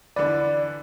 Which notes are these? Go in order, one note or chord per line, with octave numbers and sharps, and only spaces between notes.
D3 E3 B4 D5